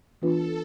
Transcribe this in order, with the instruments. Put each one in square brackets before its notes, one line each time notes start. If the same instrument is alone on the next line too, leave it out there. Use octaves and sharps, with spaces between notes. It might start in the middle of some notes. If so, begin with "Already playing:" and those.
[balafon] E3 B3 D4 F4 B4 [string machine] A4